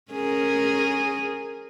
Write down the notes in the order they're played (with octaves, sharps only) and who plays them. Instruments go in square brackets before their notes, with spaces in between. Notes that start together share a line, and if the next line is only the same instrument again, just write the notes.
[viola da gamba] C#4 G#4 A#4